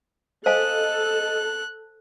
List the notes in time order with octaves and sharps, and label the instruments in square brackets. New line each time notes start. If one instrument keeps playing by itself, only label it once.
[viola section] A4 [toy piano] C5 F5 G#5 [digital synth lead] D#5 [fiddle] F#6